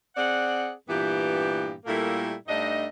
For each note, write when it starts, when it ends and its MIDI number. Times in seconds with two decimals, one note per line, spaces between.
0.16 0.71 60
0.16 0.71 68
0.16 0.71 74
0.16 0.71 78
0.89 1.72 43
0.89 1.72 46
0.89 1.72 52
0.89 1.72 59
0.89 1.72 67
1.86 2.32 46
1.86 2.32 55
1.86 2.32 57
1.86 2.32 58
1.86 2.32 64
1.86 2.32 69
2.48 2.83 43
2.48 2.83 57
2.48 2.83 62
2.48 2.83 63
2.48 2.83 75